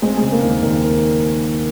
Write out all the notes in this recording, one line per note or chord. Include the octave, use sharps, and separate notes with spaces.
G#3 C4
C#3 G#3
A#3
D#2
D#2 A#3